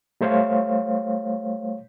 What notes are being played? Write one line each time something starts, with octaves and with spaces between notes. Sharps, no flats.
G3 A3 C5 C#5 F5